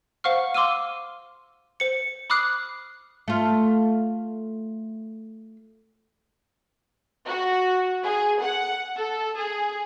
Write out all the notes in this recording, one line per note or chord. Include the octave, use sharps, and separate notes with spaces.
C5 F5 F#5 C#6 F6
F5 C6 D6 E6 F6 D#7
C5 C#7
B5 D6 D#6 F6 F#6 C7
A3 F4
F#4
G#4
F#5
A4
G#4